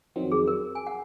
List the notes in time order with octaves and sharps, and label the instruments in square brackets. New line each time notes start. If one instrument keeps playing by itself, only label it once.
[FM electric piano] F2 D#3 F#3 C4
[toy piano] G#4
A#4
G#5
F#5